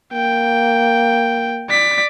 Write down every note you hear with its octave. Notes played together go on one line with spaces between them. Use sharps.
A#3 G5
D5 B6